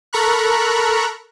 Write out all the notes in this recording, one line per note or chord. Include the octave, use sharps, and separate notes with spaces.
A4 A#4 A#5 B5 C#6 F#6